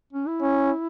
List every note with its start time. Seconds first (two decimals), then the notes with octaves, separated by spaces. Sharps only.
0.13 C#4
0.27 E4
0.41 C#4